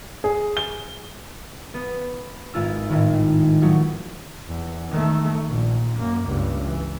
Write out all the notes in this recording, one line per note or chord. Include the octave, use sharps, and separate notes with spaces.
G#4
G7
B3
G#1 F4 E6
G#1 A2 D#3
F3 F#3 A3
E2
D#3 A3
A#1 A#2
F#2 A#3
C#2 G2
E3